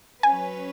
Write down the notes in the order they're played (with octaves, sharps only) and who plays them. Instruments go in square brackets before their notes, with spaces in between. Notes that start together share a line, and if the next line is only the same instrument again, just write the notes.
[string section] F#3 C#4 B4 [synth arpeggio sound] G#5